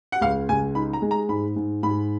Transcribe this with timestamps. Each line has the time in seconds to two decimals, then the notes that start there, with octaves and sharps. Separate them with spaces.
0.12 F#5
0.21 C#2 F5
0.49 C#2 G#5
0.75 D#4 B5
0.93 A#5
1.02 G#3
1.11 A#5
1.29 G#2 B5
1.56 G#2
1.83 G#2 B5